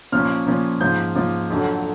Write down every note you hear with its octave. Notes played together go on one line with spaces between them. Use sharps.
A#2 F3 A#3 C#4 F6
A#2 F3 A#3 C#4
G#2 F3 A#3 G6
G#2 F3 A#3
F2 D3 F#3